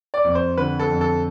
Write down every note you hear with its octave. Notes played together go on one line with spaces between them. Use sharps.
D5
F2
C5
D3 B4
A4
F2
A4